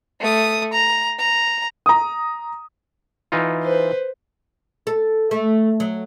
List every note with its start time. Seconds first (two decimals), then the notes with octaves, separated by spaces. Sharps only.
0.20 A3 D#6
0.73 A#5
1.19 A#5
1.86 A#5 D#6
3.32 E3 D#4 F4
3.63 B4 C5
4.87 A4
5.31 A3
5.80 F#3